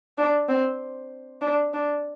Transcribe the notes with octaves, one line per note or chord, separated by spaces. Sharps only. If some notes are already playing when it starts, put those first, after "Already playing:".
D4
C4
D4
D4